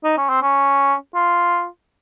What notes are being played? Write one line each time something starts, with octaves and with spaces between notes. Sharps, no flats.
D#4
C#4
C4
C#4
F4